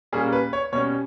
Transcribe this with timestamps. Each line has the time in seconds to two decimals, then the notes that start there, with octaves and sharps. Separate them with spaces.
0.12 A#2 G3 A#3 C#4 G#4
0.33 B4
0.53 C#5
0.72 B2 G3 C#4 C#5